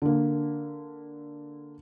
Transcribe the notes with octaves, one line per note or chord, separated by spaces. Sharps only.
D3 A#3